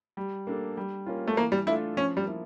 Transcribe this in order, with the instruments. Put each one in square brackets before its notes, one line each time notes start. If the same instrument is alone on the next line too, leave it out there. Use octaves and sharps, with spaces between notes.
[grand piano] G3
A#3 D4 A4
G3
A#3 C#4 F4
[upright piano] A3
[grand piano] E3 [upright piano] A#3
[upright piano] G3
[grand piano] A3 D4 F4 A4 [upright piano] E4
[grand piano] F3 [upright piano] C#4
[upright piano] G3
[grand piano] A#3 E4